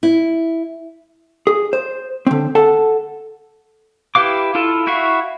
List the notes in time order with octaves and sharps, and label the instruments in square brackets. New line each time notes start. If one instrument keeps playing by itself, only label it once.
[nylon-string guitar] E4
[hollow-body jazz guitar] G#4
C5
D3 C4
A4 F#5 A5
[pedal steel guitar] E4 G4 B4 F5 D6
E4 F4 A4 A5
E4 F#4 E5 F5 C#6